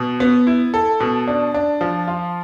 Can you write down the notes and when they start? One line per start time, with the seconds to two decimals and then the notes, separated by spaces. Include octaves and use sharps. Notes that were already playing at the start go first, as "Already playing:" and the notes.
Already playing: B2
0.20 B3
0.47 E4
0.74 A4
1.00 B2
1.28 D4
1.54 D4
1.81 F3
2.07 F4